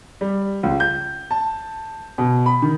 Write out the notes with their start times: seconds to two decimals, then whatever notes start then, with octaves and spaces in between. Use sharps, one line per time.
0.21 G3
0.63 C#2
0.80 G6
1.31 A5
2.18 B2
2.46 B5
2.62 D#3